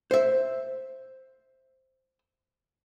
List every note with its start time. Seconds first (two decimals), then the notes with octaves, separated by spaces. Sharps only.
0.11 C5 E5